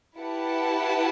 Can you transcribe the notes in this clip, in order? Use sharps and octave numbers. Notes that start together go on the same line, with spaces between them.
E4 G4 B4 F#5 A5